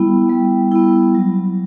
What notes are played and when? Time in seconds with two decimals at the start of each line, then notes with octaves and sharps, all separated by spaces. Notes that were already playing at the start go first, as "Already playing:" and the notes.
Already playing: G3 B3 E4
0.29 G3
0.72 B3 E4
1.15 F#3